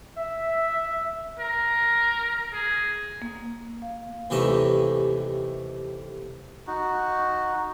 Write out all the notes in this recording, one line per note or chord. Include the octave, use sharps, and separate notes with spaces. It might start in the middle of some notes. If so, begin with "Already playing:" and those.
E5
A#4
G#4
A#3
F5
D#2 C3 E3 A3 D#5 E5
D#4 F#4